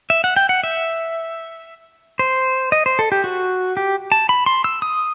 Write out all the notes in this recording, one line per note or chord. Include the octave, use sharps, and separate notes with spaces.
E5
F#5
G5
F#5
E5
C5
D#5
C5
A4
G4
F#4
G4
A5
B5
C6
E6
D#6